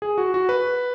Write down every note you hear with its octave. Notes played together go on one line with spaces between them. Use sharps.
G#4
F#4
F#4
B4